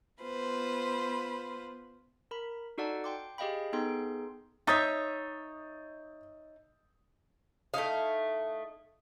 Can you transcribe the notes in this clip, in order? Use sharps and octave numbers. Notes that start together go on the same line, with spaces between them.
B3 F4 B4 C5
A#4 B5
D#4 F#4 A4 D5 F#5 A5
G5 C6 D6
G4 G#4 D#5 F5 G5 B5
B3 D#4 G#4 A4 G5 C6
D#4 C#5 E5 D#6 G6 A6
A3 D#4 E4 D#5 F5